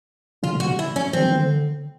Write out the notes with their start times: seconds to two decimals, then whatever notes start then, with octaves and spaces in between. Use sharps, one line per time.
0.43 C3 F4
0.55 B2
0.60 F#4
0.66 C3
0.79 E4
0.96 C#4
1.13 D3 C4
1.18 D#3
1.22 E3
1.32 D#3
1.40 D3